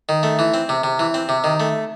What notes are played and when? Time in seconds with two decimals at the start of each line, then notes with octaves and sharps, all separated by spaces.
0.09 D#3
0.23 A3
0.39 E3
0.54 C4
0.69 C3
0.84 C3
0.99 E3
1.14 C4
1.29 C3
1.44 D#3
1.60 A3